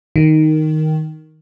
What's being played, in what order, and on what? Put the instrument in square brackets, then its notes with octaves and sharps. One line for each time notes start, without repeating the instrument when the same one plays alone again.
[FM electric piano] D#3